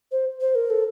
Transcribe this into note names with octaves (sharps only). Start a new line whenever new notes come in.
C5
C5
A#4
A4